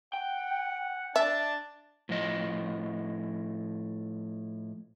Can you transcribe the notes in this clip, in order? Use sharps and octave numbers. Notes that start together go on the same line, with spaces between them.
F#5 G5
D4 E5 A5
A2 F3 D#5